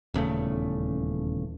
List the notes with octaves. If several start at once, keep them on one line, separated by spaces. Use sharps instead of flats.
D#1 E2 C#3 A3